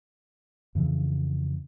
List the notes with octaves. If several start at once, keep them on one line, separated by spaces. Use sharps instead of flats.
F2 C#3 E3